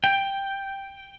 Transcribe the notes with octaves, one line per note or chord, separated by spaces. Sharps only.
G5